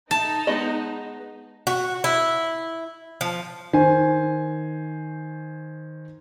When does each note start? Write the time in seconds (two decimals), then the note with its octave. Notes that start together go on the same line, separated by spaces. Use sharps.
0.11 D#4 A5
0.47 G#3 B3 D#5
1.67 F#4
2.04 E4
3.21 F3
3.73 D#3 C5 G#5